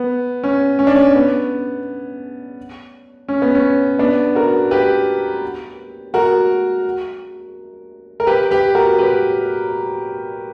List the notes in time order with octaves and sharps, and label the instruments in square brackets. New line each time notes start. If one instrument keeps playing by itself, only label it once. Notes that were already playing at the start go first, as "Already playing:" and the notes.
Already playing: [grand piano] B3
C#4
C#4
D4
C#4
B3
C#4
B3
C#4
B3 D4
F#4 A#4
G4 B4
F#4 A#4
A#4
G4 B4
G4 B4
F#4 A#4
G4 B4